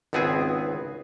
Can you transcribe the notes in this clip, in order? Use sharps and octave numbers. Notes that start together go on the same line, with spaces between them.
G#1 C#2 B3 C4 G#4 G#5